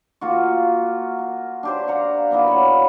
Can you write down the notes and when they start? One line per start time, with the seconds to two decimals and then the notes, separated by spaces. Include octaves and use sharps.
0.21 A#3 F4 F#4
1.19 A#4
1.63 D4 G4 C5
1.88 F5 F#5 A#5
2.31 B2 A#3 B3 E4
2.48 B4 C#5 F#5